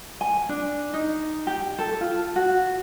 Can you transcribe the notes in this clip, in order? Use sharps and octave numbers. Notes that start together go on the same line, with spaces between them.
G#5
D4
D#4
G4
A4
F4
F#4